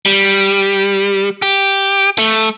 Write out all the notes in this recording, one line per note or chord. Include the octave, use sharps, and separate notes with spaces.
G3
G4
A3